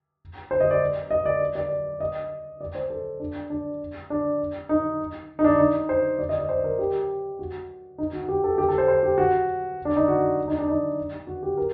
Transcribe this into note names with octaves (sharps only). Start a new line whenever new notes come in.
C5
D#5
D5
D#5
D5
D5
D#5
D5
C5
A4
D4
D4
D4
D#4
D#4
D4
D#4
C5
D5
D#5
D5
C5
A#4
G4
F#4
D#4
F#4
G4
A4
G4
A4
C5
C5
G4
F#4
D4
D#4
F#4
D#4
D4
D#4
F#4
G4
A#4